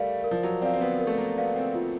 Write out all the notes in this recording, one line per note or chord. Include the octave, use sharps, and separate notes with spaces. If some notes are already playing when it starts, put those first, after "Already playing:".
Already playing: G3 A3 A#4 D5 F5
A#4
F3
F#3
C4 D5 F5
C4
B3
A#4
A3
A#3
B3 D5 F5
C4
F4